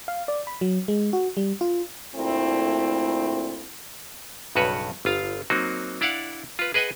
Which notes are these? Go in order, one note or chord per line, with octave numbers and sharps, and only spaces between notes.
F5
D5
B5
F#3
G#3
F#4
G3
F4
D2 A#2 A3 C4 E4
B1 G2 C#3 F#4 B4 C#5
G1 F4 F5
F#3 A#3 C4 D#4 F#4
D4 E4 D5 F5 F#5
F4 B4
G#4 B4 D#5 F#5 G#5